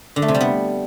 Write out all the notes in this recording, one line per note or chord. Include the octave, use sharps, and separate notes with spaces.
D3
A3
C3
G3
B3